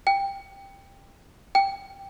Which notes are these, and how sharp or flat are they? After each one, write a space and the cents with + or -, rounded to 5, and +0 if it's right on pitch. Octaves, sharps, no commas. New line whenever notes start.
G5 +10
G5 +5